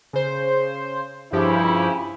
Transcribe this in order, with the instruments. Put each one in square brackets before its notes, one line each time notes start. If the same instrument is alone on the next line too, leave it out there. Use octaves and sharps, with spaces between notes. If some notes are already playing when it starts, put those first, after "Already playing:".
[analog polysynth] C#3 C5
[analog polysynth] G2 F3 G4 [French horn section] C#3 E4